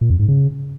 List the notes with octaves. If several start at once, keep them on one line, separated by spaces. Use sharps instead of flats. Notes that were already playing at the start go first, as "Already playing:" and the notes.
A#2
F2
G#2
C#3